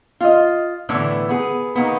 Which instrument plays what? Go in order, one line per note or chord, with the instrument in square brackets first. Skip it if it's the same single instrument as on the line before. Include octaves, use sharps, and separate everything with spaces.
[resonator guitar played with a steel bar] F4 D#5
A2 D3 E3 B3
B3 G#4
D#3 A#3 B3